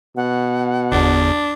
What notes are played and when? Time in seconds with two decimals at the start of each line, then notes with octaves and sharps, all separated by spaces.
0.17 B2 F#5
0.92 G1 E2 D4